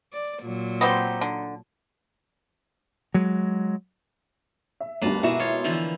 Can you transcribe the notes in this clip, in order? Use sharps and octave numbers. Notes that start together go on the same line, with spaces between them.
D5
A#2 F#3
B3 C4 D#4 G4 C6
D3
F#3 G#3
E5
G1 D2 G2 A#3 B4 A5
B2 G#3 E4 F#4 E7
F4 C#5
D3 E3 F3